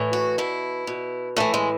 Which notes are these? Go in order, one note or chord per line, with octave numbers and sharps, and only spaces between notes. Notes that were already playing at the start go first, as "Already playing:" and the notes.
Already playing: A2 E3
F#4
B2 E4
B2
A2 E3 A3
G#3